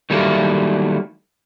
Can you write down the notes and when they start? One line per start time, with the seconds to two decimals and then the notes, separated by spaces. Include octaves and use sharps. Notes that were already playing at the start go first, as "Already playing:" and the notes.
0.10 D#3 F#3 G3 A3 A#3 E4